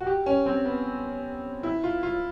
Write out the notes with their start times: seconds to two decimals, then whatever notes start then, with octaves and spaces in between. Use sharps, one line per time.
0.01 F#4
0.07 G4
0.26 C#4
0.46 C4
0.65 B3
1.63 E4
1.83 F4
2.03 F4